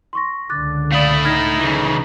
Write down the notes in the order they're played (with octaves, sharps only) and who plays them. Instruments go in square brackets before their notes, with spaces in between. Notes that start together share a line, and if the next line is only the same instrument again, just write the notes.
[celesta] C6 C#6 A#6
[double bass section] C#2 D3 [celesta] D6 F#6 A6
[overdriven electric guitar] A3 E4 [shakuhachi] D5 [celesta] F5 D#6
[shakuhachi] D#4 [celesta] F6 G#6 A#6
[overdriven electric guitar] C#3 E3